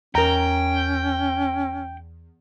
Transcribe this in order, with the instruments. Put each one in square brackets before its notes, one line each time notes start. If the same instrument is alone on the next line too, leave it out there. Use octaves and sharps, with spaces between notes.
[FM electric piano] E2 [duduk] C#4 [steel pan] A#4 A#5 [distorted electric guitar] G5